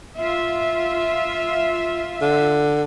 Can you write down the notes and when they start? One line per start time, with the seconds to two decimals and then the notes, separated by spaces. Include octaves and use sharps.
0.18 F4 E5
2.22 D3